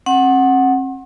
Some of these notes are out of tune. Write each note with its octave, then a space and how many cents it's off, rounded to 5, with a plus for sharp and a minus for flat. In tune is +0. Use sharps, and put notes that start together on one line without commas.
C4 +45 F#5 +0